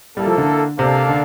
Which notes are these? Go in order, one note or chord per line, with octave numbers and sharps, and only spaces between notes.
G3 A#3 E4 A4
F3
D3
C3 A#3 D4 A4 D5 F5
D3